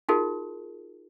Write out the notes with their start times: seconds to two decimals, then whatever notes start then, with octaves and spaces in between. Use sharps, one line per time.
0.09 D#4 F4 F#4 G#4 A#4